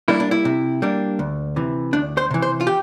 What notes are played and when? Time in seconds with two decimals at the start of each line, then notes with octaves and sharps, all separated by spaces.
0.08 G3 A#3 D4 E4
0.20 D4
0.31 E4
0.45 C3
0.82 G3 A#3 D4
1.19 D2
1.56 C3 E3
1.93 D2 D4
2.17 C5
2.31 C3 E3
2.42 C5
2.61 F4
2.67 G4